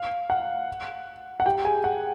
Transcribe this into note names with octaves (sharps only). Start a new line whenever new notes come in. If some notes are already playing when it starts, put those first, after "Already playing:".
Already playing: F5
F#5
F#5
G4 G5
G#4 G#5
F#5